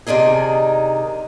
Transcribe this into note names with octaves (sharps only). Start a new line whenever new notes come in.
C3 D#3 D4 D#4 G#4